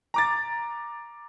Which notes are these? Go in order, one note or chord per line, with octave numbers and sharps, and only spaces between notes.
A#5 D6 A6